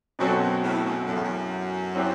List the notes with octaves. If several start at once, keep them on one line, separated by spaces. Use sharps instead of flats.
F#2 B2 F#3 C4 F#4 A4
F#2
A2
F#2
F#2 A2 F#3 A3
E2
F#2
F#3 C4 E4 G4